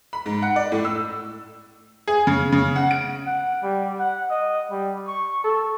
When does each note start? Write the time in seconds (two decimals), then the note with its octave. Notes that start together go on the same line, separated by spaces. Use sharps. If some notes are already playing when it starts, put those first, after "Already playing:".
0.13 B5
0.26 G#2
0.42 F#5
0.56 D5
0.72 A2
0.85 E6
2.08 G#4
2.27 C#3
2.52 C#3
2.76 F#5
2.91 D7
3.26 F#5
3.63 G3
3.99 F#5
4.30 D#5
4.71 G3
5.07 C#6
5.44 A4